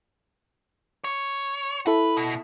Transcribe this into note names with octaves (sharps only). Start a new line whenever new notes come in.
C#5
E4 A4 B4
B2